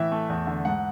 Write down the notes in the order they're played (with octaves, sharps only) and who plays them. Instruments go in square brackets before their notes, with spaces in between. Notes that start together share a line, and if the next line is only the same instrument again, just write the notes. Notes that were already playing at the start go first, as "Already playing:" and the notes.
Already playing: [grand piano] A2 E3 E5
A3
E2
D3
G#2 F#5